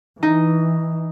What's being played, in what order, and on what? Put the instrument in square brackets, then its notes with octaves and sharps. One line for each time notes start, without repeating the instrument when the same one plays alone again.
[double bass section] E3 [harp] D#4